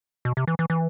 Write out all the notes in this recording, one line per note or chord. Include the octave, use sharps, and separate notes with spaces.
B2
C3
E3
E3
E3